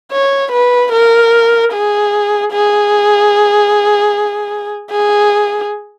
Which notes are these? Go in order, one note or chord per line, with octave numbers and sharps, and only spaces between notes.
C#5
B4
A#4
G#4
G#4
G#4